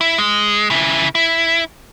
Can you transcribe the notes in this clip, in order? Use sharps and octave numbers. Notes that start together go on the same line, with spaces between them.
E4
G#3
C#3 E4
E4